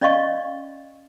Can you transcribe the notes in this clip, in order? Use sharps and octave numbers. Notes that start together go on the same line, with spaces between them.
C#4 D5 D#5 F5 C#6